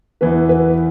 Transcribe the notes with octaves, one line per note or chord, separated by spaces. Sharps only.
E2 E3 B3 E4 B4
B4